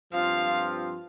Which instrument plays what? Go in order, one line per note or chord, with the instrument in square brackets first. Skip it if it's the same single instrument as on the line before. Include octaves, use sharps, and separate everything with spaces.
[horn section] G2 F3 C4 F4 [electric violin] F5